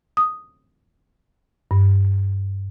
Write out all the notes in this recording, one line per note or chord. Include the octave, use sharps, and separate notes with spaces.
D#6
G2